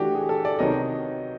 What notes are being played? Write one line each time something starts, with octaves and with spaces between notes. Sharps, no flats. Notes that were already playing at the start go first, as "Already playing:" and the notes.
Already playing: E3 A3 D4 F#4 G4
G#4
A4
D5
C3 D#3 F#3 B3 D#4 D#5